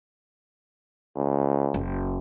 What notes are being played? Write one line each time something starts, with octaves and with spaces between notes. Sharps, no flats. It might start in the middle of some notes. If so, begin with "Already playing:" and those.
C#2
F#1